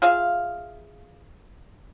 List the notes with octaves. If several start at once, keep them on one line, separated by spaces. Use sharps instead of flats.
F4 G#4 E5 F5